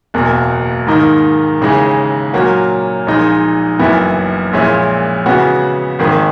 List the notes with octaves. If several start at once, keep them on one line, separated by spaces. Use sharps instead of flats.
F#1 E2 B2 A#3
G#2 D#3 A#3 D#4 A#4
D#2 C#3 E3 G#3 D#4
A#2 F#3 A#3 C#4 F#4
A#1 A#2 G#3 D#4
F#1 F#2 E3 B3 E4
A#1 A#2 G#3 C#4 E4
C#3 E3 G#3 B3 F#4
G#1 G#2 D#3 A#3